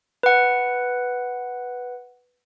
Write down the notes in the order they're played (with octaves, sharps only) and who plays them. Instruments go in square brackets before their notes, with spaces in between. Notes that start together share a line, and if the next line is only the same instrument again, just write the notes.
[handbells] B4 F#5